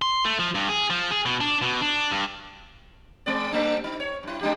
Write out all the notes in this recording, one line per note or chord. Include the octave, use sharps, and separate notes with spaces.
C6
A3
F3
G2
G#4
F3
G#4
B2
D4
B2
D4
G2
G#3 C4 D5
G3 A3 D4
D#4
C#5
G2 E4
G#3 D4 G4